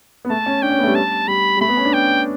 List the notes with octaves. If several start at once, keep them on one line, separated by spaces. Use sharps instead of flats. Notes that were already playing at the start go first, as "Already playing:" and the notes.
B3
A3 A5
C#4
D4 G5
C#4
B3
A3
G3
A5
G3 B5
G3
A3 B5
B3
C#4
D4
G5